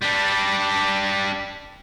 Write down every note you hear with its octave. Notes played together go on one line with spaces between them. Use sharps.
G3 D4